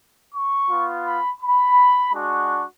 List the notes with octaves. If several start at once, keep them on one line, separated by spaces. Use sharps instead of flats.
C#6
B3 F4
B5
B5
G#3 D4 F#4